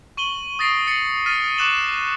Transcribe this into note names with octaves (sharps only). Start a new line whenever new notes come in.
C#6 D#7 F#7 G7
D#6 A6 A#6 C7 D7
A6 C7 C#7 F#7
F6 A6 B6 D#7
C#6 D6 F#6 C#7 E7 F#7